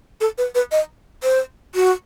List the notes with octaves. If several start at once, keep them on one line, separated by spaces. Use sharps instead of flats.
A4
B4
B4
D#5
C5
F#4